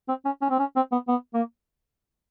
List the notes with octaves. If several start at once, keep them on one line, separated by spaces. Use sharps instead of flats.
C4
C#4
C#4
C4
C#4
C4
B3
B3
A#3